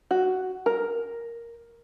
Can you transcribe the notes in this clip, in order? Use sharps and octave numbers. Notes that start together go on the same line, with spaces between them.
F#4
A#4